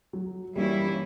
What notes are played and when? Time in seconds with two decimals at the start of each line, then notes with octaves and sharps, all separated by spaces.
0.13 F#3
0.56 E3 G3 A#3 C#4 E4